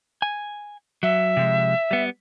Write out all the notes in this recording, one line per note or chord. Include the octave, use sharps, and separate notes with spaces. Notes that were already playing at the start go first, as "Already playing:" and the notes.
G#5
F#3 E5
C3 F3 G#3
G3 B3